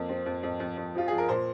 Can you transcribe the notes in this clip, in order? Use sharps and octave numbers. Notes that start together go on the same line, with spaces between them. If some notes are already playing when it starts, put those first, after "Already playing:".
Already playing: F2 A#3
C4
F2
F2
F2
F2
F3 F4
F3 G#4
A#4
A#2 C5